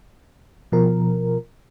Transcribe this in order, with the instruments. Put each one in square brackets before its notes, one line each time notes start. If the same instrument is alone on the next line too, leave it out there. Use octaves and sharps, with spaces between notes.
[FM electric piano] B2 F3 A#4